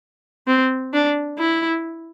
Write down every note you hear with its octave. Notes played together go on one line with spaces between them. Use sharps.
C4
D4
E4